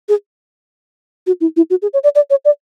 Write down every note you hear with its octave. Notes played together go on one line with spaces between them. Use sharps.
G#4
F#4
E4
E4
F#4
G#4
C#5
D5
D5
C#5
D5